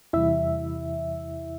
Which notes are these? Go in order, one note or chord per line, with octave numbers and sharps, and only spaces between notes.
E2 C3 E3 G3 E4 E5